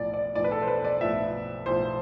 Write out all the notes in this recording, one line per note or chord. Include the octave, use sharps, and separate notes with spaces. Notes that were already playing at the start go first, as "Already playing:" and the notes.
Already playing: B1 A2 F3 D5
D5
B1 A2 F3 D5
B4
A4
C5
B4
D5
B1 A2 F3 E5
B1 A2 F3 C5